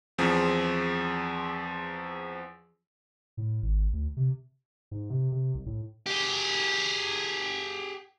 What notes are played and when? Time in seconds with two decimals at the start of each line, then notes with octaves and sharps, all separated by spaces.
0.18 E2 F3 C4 G#4 B6
3.37 A2
3.62 G#1
3.93 D2
4.17 C3
4.91 G#2
5.10 C3
5.32 C3
5.55 C2
5.66 A2
6.07 G4 G#4